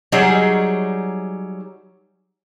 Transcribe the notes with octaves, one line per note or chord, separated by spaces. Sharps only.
F#3 G3 D#4 G#4 C#5